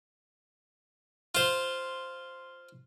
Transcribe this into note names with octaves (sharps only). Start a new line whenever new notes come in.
F4 C5